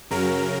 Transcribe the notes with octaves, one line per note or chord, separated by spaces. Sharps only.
F#2 C#3 F#3 A#4